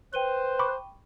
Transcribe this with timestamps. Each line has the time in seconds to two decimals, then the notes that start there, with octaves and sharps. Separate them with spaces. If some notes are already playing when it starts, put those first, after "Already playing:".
0.14 B4 C5 G5 D#7 G7
0.59 B5 C#6 D6